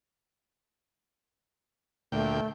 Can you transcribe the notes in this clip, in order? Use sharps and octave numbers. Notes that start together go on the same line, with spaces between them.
D2 A#2 A3 G5